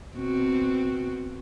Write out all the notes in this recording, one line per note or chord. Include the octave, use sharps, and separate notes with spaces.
B2 C4 F#4